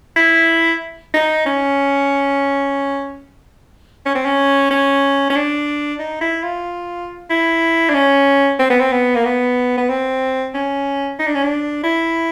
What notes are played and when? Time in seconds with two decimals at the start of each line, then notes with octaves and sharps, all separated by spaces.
0.16 E4
1.14 D#4
1.46 C#4
4.06 C#4
4.15 C4
4.25 C#4
4.71 C#4
5.30 C#4
5.36 D4
6.00 D#4
6.21 E4
6.43 F4
7.30 E4
7.89 D4
7.94 C#4
8.59 C4
8.70 B3
8.80 C4
8.92 B3
9.15 A#3
9.25 B3
9.77 B3
9.89 C4
10.54 C#4
11.19 D#4
11.27 D4
11.35 C#4
11.43 D4
11.84 E4